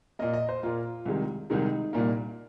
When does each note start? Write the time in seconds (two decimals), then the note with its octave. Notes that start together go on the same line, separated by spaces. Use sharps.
0.19 A#2 A#3 D#5
0.34 D#5
0.49 C5
0.63 A#2 A#3 F4
1.06 C2 C3 D#3 G#3
1.50 C2 C3 D#3 G#3 D#4
1.93 C2 A#2 A#3